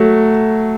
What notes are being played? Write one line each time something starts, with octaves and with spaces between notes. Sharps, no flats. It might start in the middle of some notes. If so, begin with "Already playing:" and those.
Already playing: F#3 A3